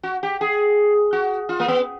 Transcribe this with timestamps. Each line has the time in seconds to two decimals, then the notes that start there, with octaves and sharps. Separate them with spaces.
0.03 F#4
0.23 G4
0.41 G#4
1.13 F#4
1.49 F4
1.60 A#3
1.68 B3